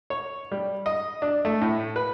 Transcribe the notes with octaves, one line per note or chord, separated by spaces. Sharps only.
C#5
G3
D#5
D4
A3
A2
B4